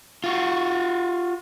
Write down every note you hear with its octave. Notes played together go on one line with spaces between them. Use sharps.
F4 F#4